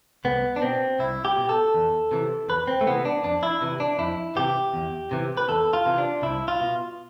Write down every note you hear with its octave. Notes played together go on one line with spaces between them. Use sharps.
C2 B3
D4
B2 C4
C2 E4
G4
B2
A4
E2
C3 E3
E2 B4
C4
A3
C3 E3 B3
D4
F2 D4
E4
C3 E3
D4
F2 E4
C3 E3 G4
E2
C3 E3
B4
E2 A4
F4
C3 E3
D4
C2 E4
F4
B2